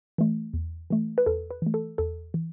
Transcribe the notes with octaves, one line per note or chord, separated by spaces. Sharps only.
E3 A3
E2
E3 A3
B4
E2 A4
B4
E3 A3
A4
E2 A4
E3